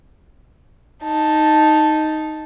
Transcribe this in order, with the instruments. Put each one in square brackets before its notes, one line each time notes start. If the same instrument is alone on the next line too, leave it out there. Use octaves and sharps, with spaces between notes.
[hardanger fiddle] D#4 A5